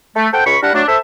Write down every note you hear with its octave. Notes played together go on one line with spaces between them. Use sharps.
A3
A4 C5 F#5 G5
C#2 B5 C#6
G3 D4 E4 A#4 F#5
F#3 A3 D4
A4 C5 E5